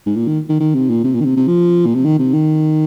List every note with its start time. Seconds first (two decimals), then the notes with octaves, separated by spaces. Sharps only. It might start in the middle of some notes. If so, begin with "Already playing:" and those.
0.06 G#2
0.16 A#2
0.27 D#3
0.49 D#3
0.60 D#3
0.74 C3
0.89 A#2
1.04 C3
1.14 A#2
1.20 D#3
1.25 C3
1.36 C3
1.47 F3
1.86 A#2
1.95 C3
2.05 D#3
2.19 C3
2.33 D#3